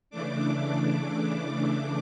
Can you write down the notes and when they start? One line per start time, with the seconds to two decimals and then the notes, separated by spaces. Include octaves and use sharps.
0.10 C#3 E3 A3 D4 D6